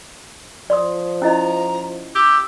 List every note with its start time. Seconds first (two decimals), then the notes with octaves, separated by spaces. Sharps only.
0.70 F3 D5 C6 D#6
1.22 C#4 E4 D#5 A#5
2.15 G4 E6